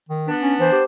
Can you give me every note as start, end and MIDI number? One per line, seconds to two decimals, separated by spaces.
0.09 0.29 51
0.27 0.80 59
0.27 0.80 62
0.42 0.55 61
0.60 0.69 52
0.60 0.84 72
0.72 0.85 67